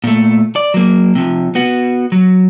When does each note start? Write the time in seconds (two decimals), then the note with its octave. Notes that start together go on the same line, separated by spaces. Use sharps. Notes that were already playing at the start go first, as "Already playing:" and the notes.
0.04 A#2 A3
0.56 D5
0.74 F#3 A#3
1.15 C3 F3
1.55 B3 F#4
2.12 F#3